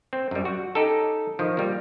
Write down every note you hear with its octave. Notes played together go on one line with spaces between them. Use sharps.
C4
F#2 G3
F#4
C#4 D#4 G4 A4
D#3 F3
G3 A#3